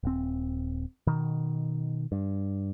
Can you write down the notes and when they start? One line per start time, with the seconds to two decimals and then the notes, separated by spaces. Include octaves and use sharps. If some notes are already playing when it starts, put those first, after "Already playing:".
0.03 D#1 C4
1.07 B2 D#3
2.12 G2